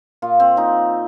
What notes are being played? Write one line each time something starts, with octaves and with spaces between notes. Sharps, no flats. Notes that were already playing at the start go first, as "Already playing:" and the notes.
A#2 F4
C4
A#2 D#4